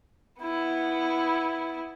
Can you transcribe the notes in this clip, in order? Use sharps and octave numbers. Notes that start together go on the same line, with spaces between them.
B3 E4